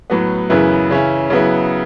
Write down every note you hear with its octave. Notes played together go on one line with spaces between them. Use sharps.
A2 F#3 B3
F#2 C#3 E3 B3 E4
C#3 E3 C#4 E4
C#3 F#3 B3 E4